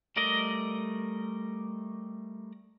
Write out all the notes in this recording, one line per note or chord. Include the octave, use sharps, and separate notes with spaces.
G3 A3 A#4 D5 D#5